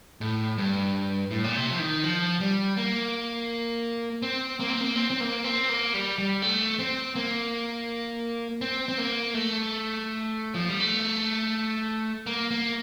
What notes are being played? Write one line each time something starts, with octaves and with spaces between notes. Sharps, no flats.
A2
G2
A2
A#2
C3
F3
D#3
F3
G3
A#3
C4
A#3
C4
A#3
C4
C4
A#3
C4
A#3
G3
G3
A3
C4
A#3
C4
C4
A#3
A3
F3
G3
A3
A#3
A#3